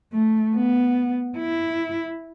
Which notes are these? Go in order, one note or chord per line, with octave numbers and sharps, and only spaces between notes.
A3
B3
E4